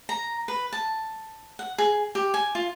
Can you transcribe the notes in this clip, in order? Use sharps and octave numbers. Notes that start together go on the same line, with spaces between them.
A#5
B4
A5
F#5
G#4
G4
G#5
F4